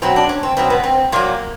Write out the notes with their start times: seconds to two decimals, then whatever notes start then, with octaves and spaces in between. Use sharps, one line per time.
0.02 B2 F#3 C4
0.16 D4
0.29 C#4
0.43 C4
0.57 B2 F#3 C4
0.70 B3
0.83 C4
1.12 A#2 F#3 A#3